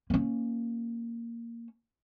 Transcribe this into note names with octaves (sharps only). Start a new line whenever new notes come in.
A#3 C#4